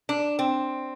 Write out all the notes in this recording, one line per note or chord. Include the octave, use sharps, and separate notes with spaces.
D4
C4